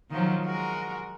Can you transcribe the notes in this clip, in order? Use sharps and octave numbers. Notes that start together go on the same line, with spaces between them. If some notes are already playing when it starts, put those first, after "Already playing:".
D#3 F3 F#3
G#3 F#4 A#4